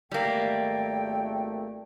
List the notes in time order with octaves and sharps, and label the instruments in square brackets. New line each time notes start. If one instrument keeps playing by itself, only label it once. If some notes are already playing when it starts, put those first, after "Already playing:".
[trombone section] G#1 A3 [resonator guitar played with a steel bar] G3 A#3 [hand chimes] D5 [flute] G5